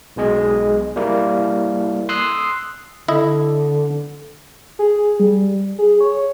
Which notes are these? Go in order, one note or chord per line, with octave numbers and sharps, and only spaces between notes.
B1 B2 G#3 G#4 D#5
G3 A#3 E4
C6 D#6 E6 F#6 C7
D3 E4 D#5
G#4
G3
G#4
C#5